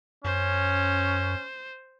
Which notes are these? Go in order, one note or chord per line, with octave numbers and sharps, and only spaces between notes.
F#2 C#4 C5